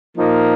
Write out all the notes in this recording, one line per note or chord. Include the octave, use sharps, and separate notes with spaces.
A#2 F3 A#3 D#4